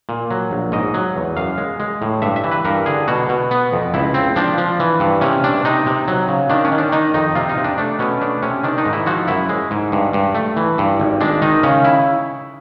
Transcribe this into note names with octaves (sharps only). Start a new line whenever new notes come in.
A#2
F#3
A#1
G#2 D#5
F#3
E2
F#2 F5
G#3
G#3
A2
G2 E5
E5
E3
B4
G2 A#4
D3 G#4
B2 F#4
B2
B3
F2
C#2 E4
C4
F3 D4
F3
E3
G2
C3 C#4
C3 D4
C3 D#4
C3
F#3
C#3
D#3 D4
C#4
D#3
D4
D#3 D#4
F2 D#4
C3 F4
D#4
C3
D4
A3 D4
B2 C#4
A3 D4
C3 C#4
D#3 D4
D#4
G#2
E4
F3 F#4
F#2 E4
G#3
G#2
G2
G2
A3
E3
G2
G#1
G#3 D4
D#3 D#4
C#3 C#4
E4